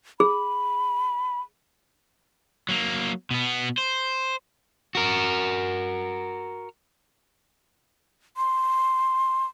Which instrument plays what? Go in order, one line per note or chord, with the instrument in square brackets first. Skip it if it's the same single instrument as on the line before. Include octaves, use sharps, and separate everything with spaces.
[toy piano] G#4 [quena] B5
[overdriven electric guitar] F#3 A#3
B2 B3
C5
F#4 A#4
[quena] C6